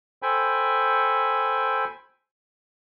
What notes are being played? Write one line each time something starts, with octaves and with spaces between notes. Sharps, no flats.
A4 C5 G5 G#5 B5